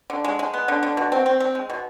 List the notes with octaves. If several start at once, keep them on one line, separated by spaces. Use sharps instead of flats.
D3
G#3
G#3
B3
D3
D3
B2
C4
C4
C4
G#3
B2